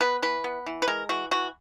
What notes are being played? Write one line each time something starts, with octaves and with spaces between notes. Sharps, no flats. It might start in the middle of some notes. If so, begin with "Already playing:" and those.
B3 B4
E3 B4
B3
E3
B4
G#3 A#4
E3 F#4
E3 F#4